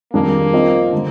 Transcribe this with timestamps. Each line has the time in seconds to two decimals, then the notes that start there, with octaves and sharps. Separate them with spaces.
0.13 F2 D#3 G3 A#3 D4 G#4
0.53 F3 C4 D#4
0.92 D3 G3